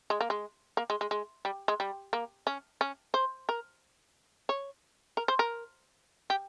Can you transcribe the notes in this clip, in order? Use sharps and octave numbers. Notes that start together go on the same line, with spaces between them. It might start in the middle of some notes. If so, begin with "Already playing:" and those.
G#3
A#3
G#3
A#3
G#3
G#3
G#3
G3
G#3
G3
A#3
C#4
C#4
C5
A#4
C#5
A#4
C5
A#4
G4